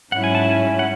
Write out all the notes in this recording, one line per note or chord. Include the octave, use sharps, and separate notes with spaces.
G#2 F#3 C#4 E4 F#5
G#5
A5
G#5
F#5